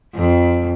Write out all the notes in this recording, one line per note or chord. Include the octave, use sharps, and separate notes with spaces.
F2